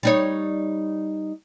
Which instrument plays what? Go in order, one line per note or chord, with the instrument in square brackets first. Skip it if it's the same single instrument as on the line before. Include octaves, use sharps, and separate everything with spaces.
[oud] G3 D#4 C#5